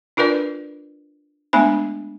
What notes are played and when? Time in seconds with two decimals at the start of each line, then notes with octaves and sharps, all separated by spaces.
0.17 D4 F4 A#4 B4 D5
1.53 G#3 A3 B3 D4 G#5